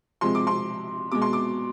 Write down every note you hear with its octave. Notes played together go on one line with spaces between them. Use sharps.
C3 F3 G#3 C6
D6
C6
B2 G#3 D6
C6
D6